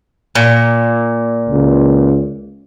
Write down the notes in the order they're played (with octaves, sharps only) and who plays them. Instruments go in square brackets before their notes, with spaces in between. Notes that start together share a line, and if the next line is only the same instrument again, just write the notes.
[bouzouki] A#2
[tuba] C#2